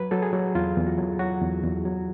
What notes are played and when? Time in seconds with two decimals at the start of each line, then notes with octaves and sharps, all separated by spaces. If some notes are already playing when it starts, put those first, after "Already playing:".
Already playing: F#3 B4
0.11 F#3 A4
0.22 G#4
0.33 F#3
0.55 E2 F4
0.77 E2
0.87 F#4
0.98 F#3
1.19 F#3 F#4
1.42 E2
1.63 E2
1.85 F#3